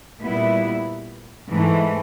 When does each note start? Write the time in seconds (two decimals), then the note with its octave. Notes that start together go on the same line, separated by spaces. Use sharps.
0.20 A#2 G3 B3 E4
1.49 G#2 E3 A3